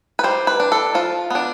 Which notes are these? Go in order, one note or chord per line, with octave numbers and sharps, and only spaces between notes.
B4
G3 C5
B4
D4
A4
F3 F4
B3 D4